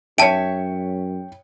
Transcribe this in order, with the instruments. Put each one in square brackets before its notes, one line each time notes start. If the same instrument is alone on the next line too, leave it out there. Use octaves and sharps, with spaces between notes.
[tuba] F#2 [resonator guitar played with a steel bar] C#5 E5 [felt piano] G5 C#7 [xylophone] A5 D7